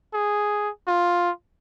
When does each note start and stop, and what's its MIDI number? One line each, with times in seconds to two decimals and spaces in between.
0.14 0.69 68
0.87 1.30 65